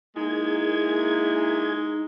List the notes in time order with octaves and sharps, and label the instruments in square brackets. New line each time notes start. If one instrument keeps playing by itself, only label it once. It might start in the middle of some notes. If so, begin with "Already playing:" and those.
[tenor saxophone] G#3 [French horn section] A#3 E4 [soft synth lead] D#4 [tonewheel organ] G#4 G#6